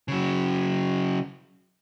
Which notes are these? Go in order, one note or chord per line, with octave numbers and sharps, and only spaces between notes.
C#3 F#3